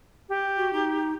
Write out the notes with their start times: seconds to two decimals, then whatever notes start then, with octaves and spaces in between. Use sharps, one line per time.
0.29 G4
0.57 F#4
0.73 D#4